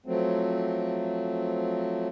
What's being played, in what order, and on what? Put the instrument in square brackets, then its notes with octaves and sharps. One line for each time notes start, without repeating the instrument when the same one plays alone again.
[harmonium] F3 F#3 A3 C4